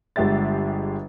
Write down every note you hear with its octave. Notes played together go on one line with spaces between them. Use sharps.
G1 G#3 G4 E5 A6